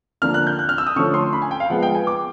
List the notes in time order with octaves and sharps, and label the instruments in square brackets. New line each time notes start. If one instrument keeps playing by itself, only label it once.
[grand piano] D3 F3 A#3 D4 F6
F#6
G6
F#6
F6
E6
D#6
D3 F3 A3 C#4 C#6
C6
B5
G#5
G5
F5
F3 G#3 B3 F#5
G5
G#5
D6